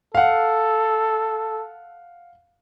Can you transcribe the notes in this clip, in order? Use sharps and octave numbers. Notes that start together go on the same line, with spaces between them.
A4 F5 F#5